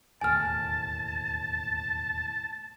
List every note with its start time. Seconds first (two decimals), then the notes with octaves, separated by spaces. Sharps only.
0.21 E1 D#2 A2 G#5 A5 F6